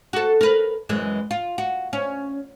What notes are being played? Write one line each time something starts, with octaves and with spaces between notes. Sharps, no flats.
F#4 A4
A#4 B4
F#2 E3 G#3
F4
F#4
C#4